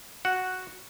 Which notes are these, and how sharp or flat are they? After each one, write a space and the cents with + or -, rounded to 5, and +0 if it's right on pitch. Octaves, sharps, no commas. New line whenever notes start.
F#4 +0 F#5 +0